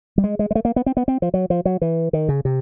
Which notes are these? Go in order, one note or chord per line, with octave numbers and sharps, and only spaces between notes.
G3
G#3
G#3
G#3
A3
A#3
B3
C4
B3
C4
F3
F#3
F3
F#3
E3
D#3
C#3
C3